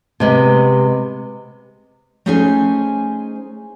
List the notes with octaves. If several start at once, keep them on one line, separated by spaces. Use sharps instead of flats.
C3 G#3 B3
A3 C#4 D#4 G#4 C5 G#5